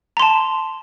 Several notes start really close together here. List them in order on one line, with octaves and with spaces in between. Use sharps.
A#5 C6 A5